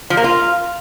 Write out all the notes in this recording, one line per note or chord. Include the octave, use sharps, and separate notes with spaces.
F3
A#3
F4